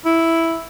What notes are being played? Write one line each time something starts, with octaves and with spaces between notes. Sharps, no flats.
E4